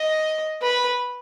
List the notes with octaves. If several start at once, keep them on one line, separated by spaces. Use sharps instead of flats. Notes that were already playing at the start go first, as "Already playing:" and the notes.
Already playing: D#5
B4